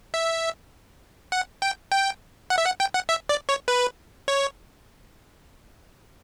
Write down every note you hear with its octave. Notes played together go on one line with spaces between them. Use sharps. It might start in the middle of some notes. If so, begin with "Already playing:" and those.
E5
F#5
G5
G5
F#5
E5
F#5
G5
F#5
E5
D5
C#5
B4
C#5